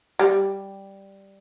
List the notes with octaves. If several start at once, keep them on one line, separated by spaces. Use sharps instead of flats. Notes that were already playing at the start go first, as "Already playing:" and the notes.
G3